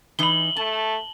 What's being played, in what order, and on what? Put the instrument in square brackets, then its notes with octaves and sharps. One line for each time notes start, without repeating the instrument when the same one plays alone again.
[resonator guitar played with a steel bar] E3 D#4 [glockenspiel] F#7 G7
[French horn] A3 [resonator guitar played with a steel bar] A5